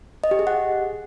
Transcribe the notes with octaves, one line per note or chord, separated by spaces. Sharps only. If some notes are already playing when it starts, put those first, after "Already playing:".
D#5
G4
G#4
F#5